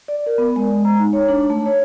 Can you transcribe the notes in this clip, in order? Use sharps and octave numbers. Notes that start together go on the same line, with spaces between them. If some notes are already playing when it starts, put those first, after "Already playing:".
D5
A#4
B3
G#3
A#5
D#4
C#5
D4
A3
C#5